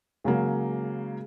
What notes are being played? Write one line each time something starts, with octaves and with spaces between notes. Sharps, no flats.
C#3 F#3 G#3 A#3 G#4